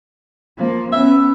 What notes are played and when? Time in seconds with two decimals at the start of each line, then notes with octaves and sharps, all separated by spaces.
0.57 F3 A#3
0.92 B3 C#4 E5